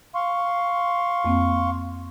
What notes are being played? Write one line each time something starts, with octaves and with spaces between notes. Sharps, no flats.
F5 C6 C#6
F2 A#3 C4